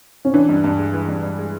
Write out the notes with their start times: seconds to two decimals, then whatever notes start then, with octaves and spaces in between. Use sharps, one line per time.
0.25 C#4
0.34 E3 D4
0.49 G2
0.64 G2
0.78 G#3
0.93 E3
1.08 G2
1.23 G2
1.38 G#3